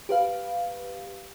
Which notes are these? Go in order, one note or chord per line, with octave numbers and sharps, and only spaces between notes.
G4 B4 F5